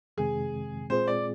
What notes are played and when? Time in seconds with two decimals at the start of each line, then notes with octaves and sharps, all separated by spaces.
0.17 F2 C3 D#3 G#3 C4 G#4
0.90 A#2 G#3 C4 F4 G#4 C5
1.08 D5